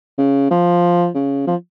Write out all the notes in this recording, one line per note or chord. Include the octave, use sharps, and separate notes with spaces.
C#3
F3
C#3
F3